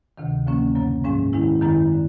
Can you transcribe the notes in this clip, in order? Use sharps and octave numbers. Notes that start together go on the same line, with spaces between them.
D2 C3 D#3
D2 D3 F3 A#3 C#4
F#2 C#3 F#3 B3
G#2 F3 G#3 C#4
D#3 G#3 C#4 E4
F#2 D#3 G#3 B3 E4
D3